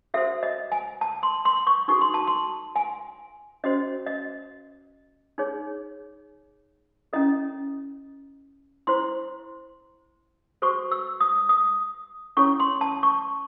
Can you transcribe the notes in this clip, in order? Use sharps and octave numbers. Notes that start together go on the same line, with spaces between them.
F#4 A4 C5 E5
D#5
G#5
A5
C6
C6
C#6
D#4 F#4 A4 C#6
C6
A5
C6
G#5
C#4 F#4 C5 D#5
D#5
D#4 G#4 C#5
C#4 E4 A4 D#5
E4 C5 C6
F#4 A4 C5 C#6
E6
D#6
D#6
C#4 E4 A4 C#5 C#6
C6
A5
C#6